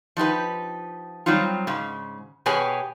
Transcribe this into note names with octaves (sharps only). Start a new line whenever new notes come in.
F3 D#4 G4 B4
F#3 G3 C4 D#4 F4
G#2 C#3
B2 G4 G#4 B4 C#5 G#5